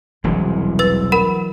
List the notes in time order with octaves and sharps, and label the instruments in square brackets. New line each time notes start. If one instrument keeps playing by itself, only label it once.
[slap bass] E1 C2 G#3 [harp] E3 F#3 D4
[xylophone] B4 E6 A6
A#4 F#5 B5